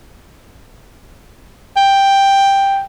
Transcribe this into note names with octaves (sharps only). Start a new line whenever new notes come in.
G5